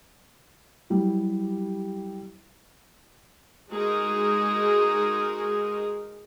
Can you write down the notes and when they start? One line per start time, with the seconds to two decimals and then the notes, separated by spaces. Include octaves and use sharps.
0.90 F#3 G3 E4 G4
3.71 G#3 D#4 F#4 G#4 A#4